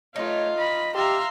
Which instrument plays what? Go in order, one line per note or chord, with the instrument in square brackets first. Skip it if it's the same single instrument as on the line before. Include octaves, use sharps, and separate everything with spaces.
[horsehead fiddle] A3 C#5 [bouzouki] D#4 B4 [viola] F4
[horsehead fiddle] D#5 B5
[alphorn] G4 [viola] E5 C6 [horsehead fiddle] F5 A#5